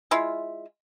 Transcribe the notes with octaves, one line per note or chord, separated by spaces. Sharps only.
G#3 E4 F4